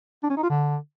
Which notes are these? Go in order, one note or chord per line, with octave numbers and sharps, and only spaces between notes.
D4
C#4
D#4
F4
D3